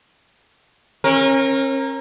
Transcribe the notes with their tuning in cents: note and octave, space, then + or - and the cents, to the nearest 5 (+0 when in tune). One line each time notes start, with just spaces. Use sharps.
C#4 -40 A#4 +0